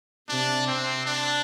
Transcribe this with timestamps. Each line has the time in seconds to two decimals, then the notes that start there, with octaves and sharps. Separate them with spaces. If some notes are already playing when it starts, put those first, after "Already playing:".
0.29 C3 D4
0.67 C4
1.06 D4